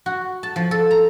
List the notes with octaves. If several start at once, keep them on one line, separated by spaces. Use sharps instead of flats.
F#4
A5
F3
A4
A#5